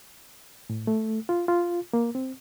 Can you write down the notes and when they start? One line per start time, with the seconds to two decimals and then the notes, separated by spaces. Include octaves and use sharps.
0.70 A2
0.87 A3
1.29 F4
1.48 F4
1.93 A#3
2.15 C4